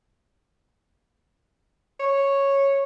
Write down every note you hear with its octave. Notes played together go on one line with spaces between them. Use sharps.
C#5